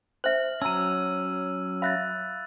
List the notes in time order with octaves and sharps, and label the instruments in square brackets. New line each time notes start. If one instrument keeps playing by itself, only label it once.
[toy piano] C5 E5 [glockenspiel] F6 F#7
[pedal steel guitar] F#3 C#4 [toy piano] A5 A#5 [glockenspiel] E6 D#7
[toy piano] E5 F5 [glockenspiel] B5 F#6 A6